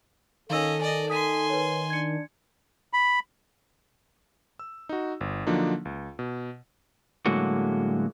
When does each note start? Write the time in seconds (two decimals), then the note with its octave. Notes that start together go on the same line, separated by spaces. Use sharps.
0.50 D#3 C#4 A4 D#5 F5 E6
0.81 D5 D#5 G#5
1.10 G#5 C6 D#6 B6 D#7
1.50 B4 C#5
1.90 D4 G#6 C#7
2.93 B5
4.59 E6
4.89 D#4 F#4
5.21 G1
5.47 D3 F3 F#3 A#3 D4 D#4
5.85 C#2
6.19 B2
7.26 A2 D3 F#3 G#3 A#3 F#4